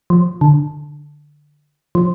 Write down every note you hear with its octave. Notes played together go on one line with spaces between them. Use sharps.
F3
D3
F3